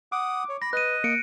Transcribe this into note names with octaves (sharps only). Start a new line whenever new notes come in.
F#5 D6 D#6
C#5
B5 A#6
B4 D#5 F#6 D#7
A#3 C#7 D7